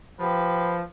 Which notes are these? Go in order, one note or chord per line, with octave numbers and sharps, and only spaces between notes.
F3 G4 B4